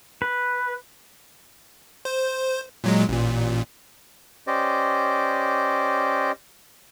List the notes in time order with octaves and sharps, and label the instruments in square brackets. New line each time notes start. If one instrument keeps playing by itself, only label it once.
[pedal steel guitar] B4
[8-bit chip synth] C5
A#2 F#3 G#3
A1 A#2
[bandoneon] C#4 G4 C5 D5 D#5